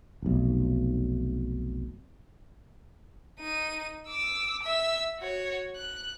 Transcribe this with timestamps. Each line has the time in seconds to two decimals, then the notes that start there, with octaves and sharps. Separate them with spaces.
0.22 F1 B1
3.40 D#4 D#7
4.08 D6 E6
4.63 E5 E6
5.19 F#4 C#5
5.76 F#6